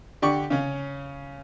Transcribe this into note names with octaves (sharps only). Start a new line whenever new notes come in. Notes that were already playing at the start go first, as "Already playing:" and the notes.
D3 G4 D5 C#6
C#3 C#4